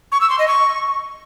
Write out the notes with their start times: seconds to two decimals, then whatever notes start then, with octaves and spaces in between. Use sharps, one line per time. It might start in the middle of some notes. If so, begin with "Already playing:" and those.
0.12 C#6
0.21 E6
0.30 C6
0.39 D#5
0.48 C#6